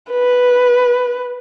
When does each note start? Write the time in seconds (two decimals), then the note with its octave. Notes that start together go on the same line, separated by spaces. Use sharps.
0.11 B4